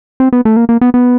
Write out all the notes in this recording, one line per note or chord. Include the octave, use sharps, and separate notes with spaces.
C4
B3
A3
A#3
A#3
B3
B3